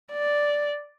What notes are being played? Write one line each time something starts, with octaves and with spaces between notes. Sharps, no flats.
D5